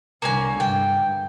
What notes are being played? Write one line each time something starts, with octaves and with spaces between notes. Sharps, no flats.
C2 D3 A#3 C#4 G#5
G2 G5